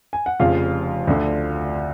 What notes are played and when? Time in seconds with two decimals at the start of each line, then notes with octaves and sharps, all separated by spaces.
0.13 G#5
0.26 F#5
0.40 F1 F2 C#3 F4 F5
1.07 D2 D3